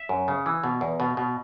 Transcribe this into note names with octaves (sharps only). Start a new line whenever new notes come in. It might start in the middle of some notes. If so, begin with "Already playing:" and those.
Already playing: E5
F#2
C#3
E3
B2
E2
B2
B2